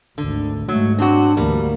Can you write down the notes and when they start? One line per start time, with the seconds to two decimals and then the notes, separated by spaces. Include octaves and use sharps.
0.18 G#1 D2 D3
0.69 G#2 F#3 G#3 A3
0.99 C4 D4 F#4
1.37 D2 E3 G3 A#3